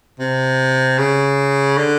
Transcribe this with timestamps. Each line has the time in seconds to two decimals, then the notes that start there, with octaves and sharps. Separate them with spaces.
0.20 C3
0.98 C#3
1.77 D3